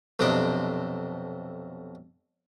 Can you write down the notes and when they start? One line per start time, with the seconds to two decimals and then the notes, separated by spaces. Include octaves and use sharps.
0.19 B1 F2 C3 D4 D#5 D6